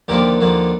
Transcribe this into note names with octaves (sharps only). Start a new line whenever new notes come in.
D#2 D3 F3 A#3 G4 A#4
D#2 D3 F3 A#3